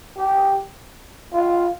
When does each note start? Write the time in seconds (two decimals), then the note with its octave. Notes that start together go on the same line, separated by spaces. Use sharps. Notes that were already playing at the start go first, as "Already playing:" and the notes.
0.17 G4
1.33 F4